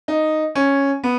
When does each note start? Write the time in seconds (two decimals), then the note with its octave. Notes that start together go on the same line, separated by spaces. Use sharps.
0.08 D#4
0.55 C#4
1.04 B3